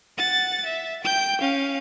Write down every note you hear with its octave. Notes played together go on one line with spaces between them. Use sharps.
F#5 A6
E5
G5 G6
C#4 F5